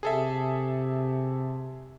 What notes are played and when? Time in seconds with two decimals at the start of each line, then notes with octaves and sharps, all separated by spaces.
0.03 C3 G#4 A4 E5